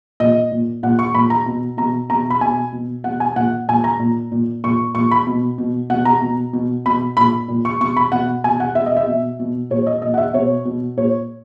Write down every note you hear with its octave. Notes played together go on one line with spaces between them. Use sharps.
A#2 D#5
A#2
A#2 F#5
C#6
A#2 B5
A#5
B2
B2 A#5
B2 A#5
B5
B2 G#5
B2
B2 F#5
G#5
A#2 F#5
A#2 G#5
A#5
A#2
A#2
A#2 C#6
A#2 C#6
B5
B2
B2
B2 F#5
A#5
B2
B2
B2 B5
A#2 B5
A#2
C#6
B2 C#6
B5
B2 F#5
B2 G#5
F#5
B2 E5
D#5
E5
B2
B2
A#2 C#5
D#5
A#2 D#5
F#5
E5
B2 C#5
B2
A#2 C#5